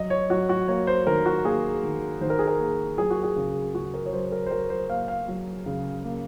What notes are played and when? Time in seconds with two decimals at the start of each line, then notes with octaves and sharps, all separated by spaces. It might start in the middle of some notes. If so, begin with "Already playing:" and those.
Already playing: F#3 D#5
0.10 C#5
0.30 F#3 F#4
0.49 F#4
0.68 A#3 C#5
0.87 C5
1.07 D#3 A#4
1.26 F#4
1.45 A#3 G#4
1.83 D#3
2.21 D#3 C5
2.30 A#4
2.39 G#4
2.48 A#4
2.59 A#3
2.98 F#3 G#4
3.10 F#4
3.23 G#4
3.36 C#3
3.75 C#3 F#4
3.94 A#4
4.06 C#5
4.13 F#3 C5
4.32 A#4
4.46 C5
4.51 F#3 A#4
4.70 C5
4.89 A#3 F5
5.08 F5
5.28 F#3
5.66 C#3
6.04 A#3